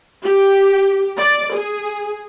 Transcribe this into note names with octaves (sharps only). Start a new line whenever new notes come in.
G4
D5
G#4